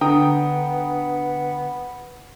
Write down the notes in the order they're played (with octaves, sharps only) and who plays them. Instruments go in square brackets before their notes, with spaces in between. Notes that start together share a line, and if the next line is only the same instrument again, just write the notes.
[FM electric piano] D3 [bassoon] B3 [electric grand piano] G5 A#5 D#6